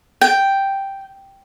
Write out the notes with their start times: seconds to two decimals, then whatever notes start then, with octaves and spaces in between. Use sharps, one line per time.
0.21 G5